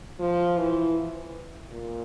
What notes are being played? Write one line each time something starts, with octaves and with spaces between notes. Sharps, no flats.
F3
E3
A#2